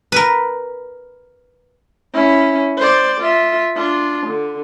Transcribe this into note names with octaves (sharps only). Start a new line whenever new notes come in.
A#4 B4
C#4 E4
C5 D5
F4 E5
D4 F4
D3